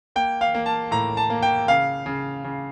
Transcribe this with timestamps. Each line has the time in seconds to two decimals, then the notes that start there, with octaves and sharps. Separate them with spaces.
0.16 A#3 G5
0.41 F5
0.54 A#3
0.66 A5
0.91 A2 A#5
1.17 A5
1.30 A#3
1.43 G5
1.68 C#3 F5
2.06 C#3
2.44 C#3